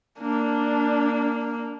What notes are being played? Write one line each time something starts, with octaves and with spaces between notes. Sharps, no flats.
A#3 D4